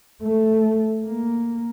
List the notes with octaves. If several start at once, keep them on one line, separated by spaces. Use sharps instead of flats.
A3
A#3